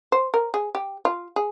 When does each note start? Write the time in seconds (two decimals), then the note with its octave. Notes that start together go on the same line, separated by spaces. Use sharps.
0.12 C5
0.34 A#4
0.54 G#4
0.75 G4
1.05 F4
1.36 G#4